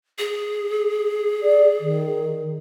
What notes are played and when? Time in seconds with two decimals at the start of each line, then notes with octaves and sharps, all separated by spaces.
0.18 G#4
1.43 D5
1.80 D#3